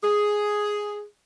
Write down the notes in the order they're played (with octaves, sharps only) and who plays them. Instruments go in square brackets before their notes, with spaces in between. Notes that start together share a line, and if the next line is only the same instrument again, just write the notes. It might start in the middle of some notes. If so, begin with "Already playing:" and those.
[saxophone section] G#4